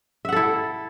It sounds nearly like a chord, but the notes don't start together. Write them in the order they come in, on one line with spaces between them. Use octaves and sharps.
E5 F#5 A4 E4